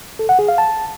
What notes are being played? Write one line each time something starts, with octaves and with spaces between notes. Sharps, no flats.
A4
F#5
G#4
F5
A5